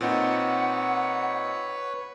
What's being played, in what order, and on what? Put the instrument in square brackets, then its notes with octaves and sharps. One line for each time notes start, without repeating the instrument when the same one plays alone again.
[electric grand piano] A#2 C4 D#4 [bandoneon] B4 C#5 [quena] F#5